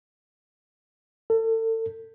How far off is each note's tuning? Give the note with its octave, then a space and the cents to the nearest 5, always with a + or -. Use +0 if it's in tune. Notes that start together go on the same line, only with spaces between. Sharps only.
A4 +35